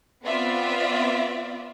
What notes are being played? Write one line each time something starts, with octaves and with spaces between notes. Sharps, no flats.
B3 C4 F4 D5 E5